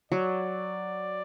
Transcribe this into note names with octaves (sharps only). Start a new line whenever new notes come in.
F#3 D5